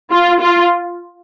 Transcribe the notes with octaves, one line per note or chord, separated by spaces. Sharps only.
F4
F4